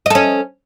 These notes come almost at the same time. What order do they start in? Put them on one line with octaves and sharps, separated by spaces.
D#5 A4 C#4